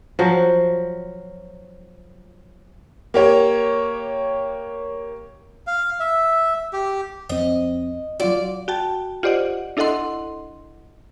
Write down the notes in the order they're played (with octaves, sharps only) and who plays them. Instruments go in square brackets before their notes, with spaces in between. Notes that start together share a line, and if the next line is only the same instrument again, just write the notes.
[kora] F3 F#3
[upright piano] A#3 G4 C#5
[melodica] F5
E5
G4
[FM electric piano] F2 C4 [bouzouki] D#5
[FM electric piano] F#3 F4 F#4 [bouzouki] D5
[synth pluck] F#4 G5 A5
F4 G4 C5 D5 D#5 F#5
D4 E4 A4 D#5 F#5 C6